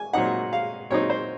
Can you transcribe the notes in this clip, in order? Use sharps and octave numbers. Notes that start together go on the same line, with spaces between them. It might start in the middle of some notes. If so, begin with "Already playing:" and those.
Already playing: G#5
A#2 F#3 C4 D#4 F#5
F5
A#2 F#3 C4 D#4 C#5
C5